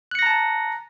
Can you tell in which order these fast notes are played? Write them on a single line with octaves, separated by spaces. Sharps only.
F#6 C#7 A#6 A#5 A5